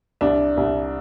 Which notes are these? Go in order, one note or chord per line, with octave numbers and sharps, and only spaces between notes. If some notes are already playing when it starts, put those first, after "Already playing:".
C2 D4
C2